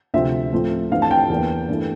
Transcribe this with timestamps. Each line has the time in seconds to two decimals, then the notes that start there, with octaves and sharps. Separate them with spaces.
0.14 D2 C3 F3 C4 E5
0.53 A2 F3 A3 C4
0.91 G2 E3 A3 C4 F5
1.02 A5
1.11 G5
1.30 E2 E3 A#3 D4
1.68 G2 E3 A3